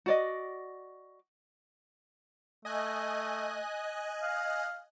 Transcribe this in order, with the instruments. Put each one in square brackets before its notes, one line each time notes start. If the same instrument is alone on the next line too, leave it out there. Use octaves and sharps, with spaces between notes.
[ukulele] F#4 D5 D#5
[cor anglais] A3 [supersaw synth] D#5 G#5 F#6
[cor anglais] F5